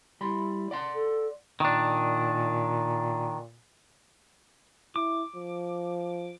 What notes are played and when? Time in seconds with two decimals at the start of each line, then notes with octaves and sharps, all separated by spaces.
0.21 G3 E4 B5 C6
0.71 D5 F#5 C6
0.95 A4
1.60 A#2 D#3 D4
4.96 E4 D6
5.36 F3